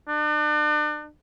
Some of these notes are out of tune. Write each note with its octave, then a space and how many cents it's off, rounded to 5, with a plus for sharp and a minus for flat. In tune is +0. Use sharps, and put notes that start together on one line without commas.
D4 +40